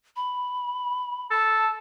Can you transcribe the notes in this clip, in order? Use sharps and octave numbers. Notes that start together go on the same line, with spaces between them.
B5
A4 A5